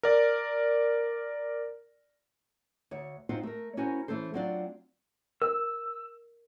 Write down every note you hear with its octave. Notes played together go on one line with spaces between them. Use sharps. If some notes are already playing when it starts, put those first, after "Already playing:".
A#4 D5
D2 C#5
C4 D#4 F4 F#4 C5
A3 A#4
C#4 E4 F#4 A#4 C5 G#5
E3 F3 A3 C#4 A4 C5
F#3 C4 D4 F4 F#4 D5
A#4 E6